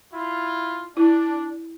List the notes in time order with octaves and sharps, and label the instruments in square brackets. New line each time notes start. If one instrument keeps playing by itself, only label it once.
[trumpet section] E4 F4
[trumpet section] D4 [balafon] E4